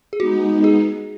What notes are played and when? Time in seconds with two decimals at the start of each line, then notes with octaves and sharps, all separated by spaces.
0.13 G#4
0.20 G#3 B3 D#4 F#4
0.64 G#4